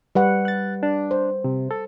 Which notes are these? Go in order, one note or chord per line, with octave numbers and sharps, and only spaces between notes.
G3 B4 F#5
F#6 A6
D4
C5
C3
A4